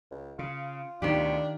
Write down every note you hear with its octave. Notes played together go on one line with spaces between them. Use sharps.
C#2
C#3 F4
D2 B2 D#3 D4 G4